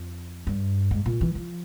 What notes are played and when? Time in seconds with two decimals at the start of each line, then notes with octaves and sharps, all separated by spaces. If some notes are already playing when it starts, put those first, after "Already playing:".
Already playing: F2
0.47 G2
0.91 G#2
1.06 A#2
1.21 E3
1.35 F3